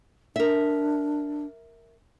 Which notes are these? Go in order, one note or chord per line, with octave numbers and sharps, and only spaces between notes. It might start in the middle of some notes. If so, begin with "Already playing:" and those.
D4 A#4 E5